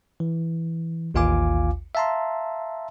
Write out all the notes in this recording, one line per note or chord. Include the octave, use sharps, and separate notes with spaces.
E3
A1 D#2 F4 F5 G#5 D6
E5 F5 A5 A#5 C6